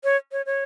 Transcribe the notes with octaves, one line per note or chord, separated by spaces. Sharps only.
C#5
C#5
C#5